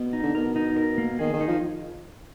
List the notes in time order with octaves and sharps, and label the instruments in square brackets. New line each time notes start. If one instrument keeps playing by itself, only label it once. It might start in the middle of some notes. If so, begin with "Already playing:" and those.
Already playing: [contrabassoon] B2
[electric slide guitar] D#4
[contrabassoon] D3
[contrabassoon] B2 [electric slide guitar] A#4
[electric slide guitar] D#4
A#4
A#3
[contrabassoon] D#3 [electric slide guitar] G#4
[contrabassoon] D#3
[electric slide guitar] D#4
[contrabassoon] F3